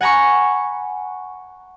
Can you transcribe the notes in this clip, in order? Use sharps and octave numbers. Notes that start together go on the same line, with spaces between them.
F#5 G#5 A#5 B5 C#6